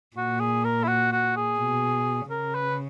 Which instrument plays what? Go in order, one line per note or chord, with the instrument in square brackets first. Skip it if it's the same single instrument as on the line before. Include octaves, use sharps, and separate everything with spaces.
[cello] A#2 [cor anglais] F#4
[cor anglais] G#4
A#4
E4
F#4
F#4
G#4
[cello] B2
[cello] C#3 [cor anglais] A#4
[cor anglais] B4